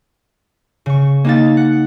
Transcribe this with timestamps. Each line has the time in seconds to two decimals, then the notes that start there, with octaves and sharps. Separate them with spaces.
0.86 C#3 C#6
1.25 A#3 D#4 D#5 F5 A6
1.57 F#5